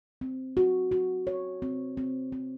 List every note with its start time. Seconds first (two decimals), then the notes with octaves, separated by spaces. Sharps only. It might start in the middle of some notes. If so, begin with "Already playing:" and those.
0.21 C4
0.57 F#4
0.92 F#4
1.27 C#5
1.62 C4
1.97 C4
2.32 C4